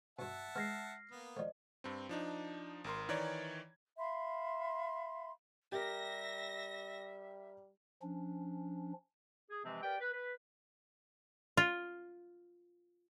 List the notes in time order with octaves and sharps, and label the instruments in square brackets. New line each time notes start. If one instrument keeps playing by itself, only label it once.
[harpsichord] G2 B2 [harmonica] E5 F#5 A5
[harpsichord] G#3 B3 [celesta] F6 A#6 C7
[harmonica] A#3 B3
[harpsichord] F3 A3 [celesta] C5 D5 D#5
[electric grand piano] G2 C4
F3 D4 D#4
G#1 A#4 C6
D#3 E3 C#5 D5 A#5 G#6
[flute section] E5 F5 B5 C6
[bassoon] G3 [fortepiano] G4 A#4 [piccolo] E5 [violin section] A#6
[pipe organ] F3 C#4 D4
[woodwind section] G#4
C3 E3 F3 G#3 C4
G4 A#4 B4 D5 G5
B4
B4
[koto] F4